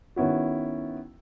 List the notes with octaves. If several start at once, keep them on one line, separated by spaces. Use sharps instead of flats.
D#3 B3 C#4 E4 F#4